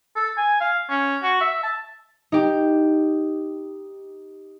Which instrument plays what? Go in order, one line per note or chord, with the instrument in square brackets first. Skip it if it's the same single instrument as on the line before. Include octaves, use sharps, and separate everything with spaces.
[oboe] A4
G#5
F5
C#4
F#4
E5
A5
[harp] D#4 G4